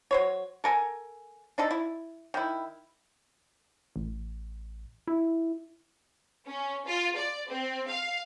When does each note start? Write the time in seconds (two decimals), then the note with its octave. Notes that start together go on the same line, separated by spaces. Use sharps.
0.11 F#3 C5 C#5
0.64 A4 A#4 G#5
1.58 D4 D#4 A4
1.71 E4
2.34 D#3 E4
3.96 A1
5.08 E4
6.47 C#4
6.86 F4
7.17 D5
7.48 C4
7.88 F5